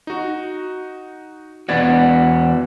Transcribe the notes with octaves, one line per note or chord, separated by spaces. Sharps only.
D#4 F#4
E2 B3 F#4 D5 G#6 A6